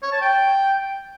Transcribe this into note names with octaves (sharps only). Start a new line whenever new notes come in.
C#5
A5
G5